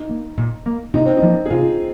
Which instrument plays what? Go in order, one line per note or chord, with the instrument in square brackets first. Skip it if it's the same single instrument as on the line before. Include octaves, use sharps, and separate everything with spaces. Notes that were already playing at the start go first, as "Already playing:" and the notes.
Already playing: [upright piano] D#4
[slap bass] A#3
A#2
A#3
[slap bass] C3 [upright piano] D#4
[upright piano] C4
D#4
[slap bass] F3 A#3
[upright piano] G#4
[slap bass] C3 [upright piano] F4